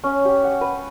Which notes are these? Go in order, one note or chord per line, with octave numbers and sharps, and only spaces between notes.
C#4
G4
F#5
B4